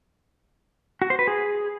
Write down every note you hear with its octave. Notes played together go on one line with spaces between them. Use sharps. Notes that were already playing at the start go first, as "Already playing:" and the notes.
F#4
C5
B4
G#4